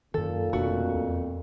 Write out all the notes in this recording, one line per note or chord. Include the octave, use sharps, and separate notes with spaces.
F#2 A#2 D#3 A4
F1 F2 B2 A3 D4 F#4
E2